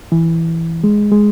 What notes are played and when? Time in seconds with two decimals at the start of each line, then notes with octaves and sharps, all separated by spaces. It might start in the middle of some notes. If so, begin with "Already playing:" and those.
0.12 E3
0.84 G#3
1.11 G#3